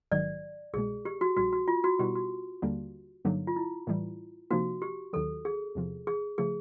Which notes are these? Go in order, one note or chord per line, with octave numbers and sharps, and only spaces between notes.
A#1 G#2 D#3 F#3 D5
C2 B2 G#3 G#4
G4
F#4
A#1 A#2 G3 F#4
F#4
F4
F#4
B2 G3 B3 E4 G4
F#4
D#2 D3 G3 A#3 D4
G2 D3 F#3 A#3 D#4
F4
E4
A2 E3 G3
C3 F3 A#3 D#4 F#4
G4
D#2 D#3 F#3 A4
G#4
E2 C3 F3
G#4
C#3 F3 A3 G#4